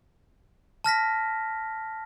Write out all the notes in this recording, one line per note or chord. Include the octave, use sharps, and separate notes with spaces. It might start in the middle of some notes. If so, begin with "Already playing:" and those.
A5 F6 A#6 B6